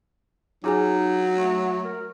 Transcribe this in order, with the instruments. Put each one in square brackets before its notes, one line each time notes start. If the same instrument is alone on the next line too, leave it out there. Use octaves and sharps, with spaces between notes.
[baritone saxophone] F#3 [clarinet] D#4 [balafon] F4 G#4 G#5
[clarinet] A3
A#4